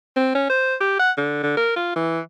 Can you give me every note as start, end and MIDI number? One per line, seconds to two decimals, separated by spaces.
0.16 0.32 60
0.35 0.45 61
0.49 0.75 72
0.81 0.98 67
0.99 1.11 78
1.17 1.40 50
1.43 1.52 50
1.57 1.74 70
1.76 1.93 65
1.96 2.20 52